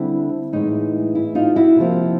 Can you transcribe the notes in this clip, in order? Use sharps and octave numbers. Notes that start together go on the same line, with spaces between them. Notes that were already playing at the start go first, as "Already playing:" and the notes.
Already playing: D3 G3 C4 E4
A2 E3 G#3 B3 D#4
E4
D#4 F4
E4 F#4
C3 F3 A#3